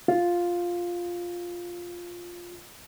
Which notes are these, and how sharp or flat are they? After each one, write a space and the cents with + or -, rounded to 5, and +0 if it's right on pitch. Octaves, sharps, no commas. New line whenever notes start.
F4 +5